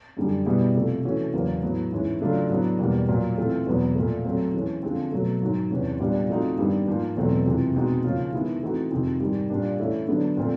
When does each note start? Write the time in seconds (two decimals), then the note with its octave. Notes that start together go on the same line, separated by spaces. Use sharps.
0.17 F#2 D3 G3
0.46 B2 G3 B3 E4 G#4
0.75 C3 F3 A3
1.04 E3 A3 C#4 F#4
1.33 E2 C#3 F#3 A#3
1.62 A2 F#3 B3
1.92 G#2 E3 G#3 C#4 E4
2.21 C#3 F#3 A3 D4 F4
2.50 A2 F#3 B3 D4
2.79 E2 B2 G3 A#3
3.09 A#2 F#3 A#3
3.37 E3 A3 C4 F4
3.67 E2 B2 F#3 B3
3.95 A#2 F3 A3
4.25 F#3 A3 C4
4.54 E3 G#3 C#4
4.83 D3 F3 G#3 C4
5.12 B2 F#3 A3
5.42 G#2 D#3 F#3
5.71 E2 C3 E3 G#3 C#4
6.00 A#2 G3 B3 D4
6.29 F3 A3 C4 D#4 F#4
6.58 G2 D#3 G3 B3
6.87 G#2 F3 A#3
7.17 E2 B2 F#3 A3 C4
7.46 F2 C3 E3 G#3 C4
7.75 B2 G#3 C4 D#4 F#4
8.04 C#3 F3 A#3 C#4 F4
8.33 D#3 G#3 B3 E4
8.62 E3 A3 C4 D#4 F#4
8.91 F2 C3 D#3 G#3 C4
9.20 G#2 D#3 G3
9.50 A#2 G3 A#3 D4
9.79 E3 A3 C#4 E4
10.08 D3 F#3 B3 D4
10.37 A#2 F3 A3 C4 F4